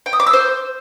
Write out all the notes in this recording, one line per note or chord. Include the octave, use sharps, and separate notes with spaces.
G5
D#6
D6
E6
C5